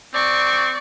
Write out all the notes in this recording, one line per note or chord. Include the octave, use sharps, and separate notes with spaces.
C4 D5 C#6